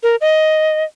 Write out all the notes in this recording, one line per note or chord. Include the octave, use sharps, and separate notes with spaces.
A#4
D#5